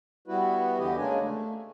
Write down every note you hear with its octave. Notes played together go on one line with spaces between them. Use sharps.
G3 B3 E4 F#4 B4
E2 D3 E3 G4 D#5
C#3 G#3 A#3 C#4 D4 G#5
A3